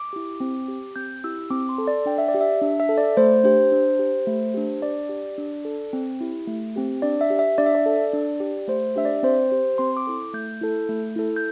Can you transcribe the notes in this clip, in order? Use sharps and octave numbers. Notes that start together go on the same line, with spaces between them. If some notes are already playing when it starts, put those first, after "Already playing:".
Already playing: D6
E4 G4
C4
G4
C4 G6
E4 G4 E6
C4 D6
C6
A4
D5
D4 G5
E5
D5
G4
E5
D4
E5
A4
D5
A3 C5
D4 G4 C5
D4
G4
A3
D4 G4
D4 D5
G4
D4
A4
C4
E4 G4
A3
C4 G4
D4 D5
E5
G4
E5
D4 D5
E5
D5
A4
D4
G4
A3 C5
D4 G4 E5
D5
C4 C5
G4 C5
C4 C6
D6
E4 A4
A3 G6
E4 A4
A3
E4 A4
G6